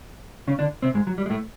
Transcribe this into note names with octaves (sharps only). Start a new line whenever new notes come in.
C#3 C#4
D3 D4
C3 C4
G#2 G#3
F#3
G3
G#3
A2 A3